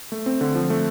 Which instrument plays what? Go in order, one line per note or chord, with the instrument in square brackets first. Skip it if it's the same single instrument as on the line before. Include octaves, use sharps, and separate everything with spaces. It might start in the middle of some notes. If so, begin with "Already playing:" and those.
[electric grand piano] A3
C4
D3
F3
A3